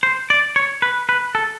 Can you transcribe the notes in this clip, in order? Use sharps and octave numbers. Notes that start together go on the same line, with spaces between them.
C5
D5
C#5
B4
B4
A4